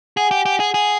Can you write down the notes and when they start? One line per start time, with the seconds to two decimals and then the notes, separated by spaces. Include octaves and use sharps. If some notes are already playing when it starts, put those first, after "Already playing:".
0.17 G#4 F#5 G#5
0.31 G4
0.46 G4
0.60 G#4
0.74 G#4